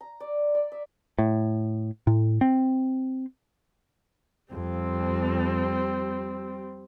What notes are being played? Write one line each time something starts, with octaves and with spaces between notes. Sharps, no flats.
A#5
D5
D5
E5
A2
A2
C4
F2 G3 C4